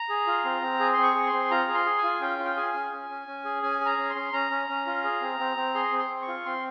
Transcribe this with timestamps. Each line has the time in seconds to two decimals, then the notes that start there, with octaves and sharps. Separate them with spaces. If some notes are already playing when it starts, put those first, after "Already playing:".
Already playing: A#5
0.09 G#4
0.27 F4
0.45 C4
0.62 C4
0.80 G#4
0.93 C4 C6
1.03 C#6
1.15 G#4
1.26 C6
1.33 C4
1.51 F4 A#5
1.68 G#4
1.74 C6
1.86 G#4
1.97 G#5
2.04 F4
2.21 C#4 G5
2.39 F4
2.45 G5
2.57 G#4 G#5
2.74 C#4
2.92 C#4
3.09 C#4
3.27 C#4
3.45 G#4
3.62 C#4 G#5
3.81 G#4
3.86 A#5
3.98 C#4
4.10 C6
4.15 C#4
4.33 C#4 A#5
4.51 C#4
4.69 C#4
4.86 F4
5.04 G#4
5.21 C4
5.39 C4
5.57 C4
5.75 G#4 C6
5.92 C4
5.98 C6
6.10 C4
6.22 C#6
6.28 F4
6.45 C4 C6